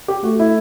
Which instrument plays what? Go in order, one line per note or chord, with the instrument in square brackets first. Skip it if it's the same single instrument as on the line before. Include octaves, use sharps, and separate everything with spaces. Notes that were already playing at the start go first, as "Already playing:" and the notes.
[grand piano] G4
[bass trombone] A3 [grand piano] F#4
[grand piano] E4